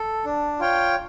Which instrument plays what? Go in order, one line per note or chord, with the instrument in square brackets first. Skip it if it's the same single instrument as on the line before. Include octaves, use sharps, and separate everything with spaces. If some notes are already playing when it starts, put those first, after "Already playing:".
Already playing: [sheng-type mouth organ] A4
D4
F4 C#5 G5